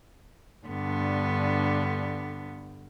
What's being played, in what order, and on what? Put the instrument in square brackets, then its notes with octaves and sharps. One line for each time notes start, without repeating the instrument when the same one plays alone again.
[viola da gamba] G2 D3 B3